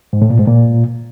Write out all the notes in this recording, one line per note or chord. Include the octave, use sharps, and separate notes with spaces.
G#2
A2
A#2
G#2
A#2